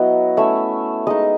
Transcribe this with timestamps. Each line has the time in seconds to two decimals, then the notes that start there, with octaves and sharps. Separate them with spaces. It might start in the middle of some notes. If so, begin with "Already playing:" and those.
Already playing: F#3 B3 E4 D#5
0.37 A3 C#4 E4 E5
1.07 G#3 D#4 D#5